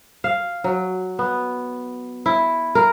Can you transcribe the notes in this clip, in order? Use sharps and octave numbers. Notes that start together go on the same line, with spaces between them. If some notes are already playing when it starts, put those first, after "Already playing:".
F5
F#3
B3
E4
A#4